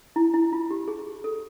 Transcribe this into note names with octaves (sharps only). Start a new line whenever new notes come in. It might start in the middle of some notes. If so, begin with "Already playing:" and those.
E4
E4
F4
G4
G#4
A4